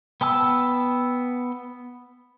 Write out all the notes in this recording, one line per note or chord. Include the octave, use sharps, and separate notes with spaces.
B3 G5 A5 E6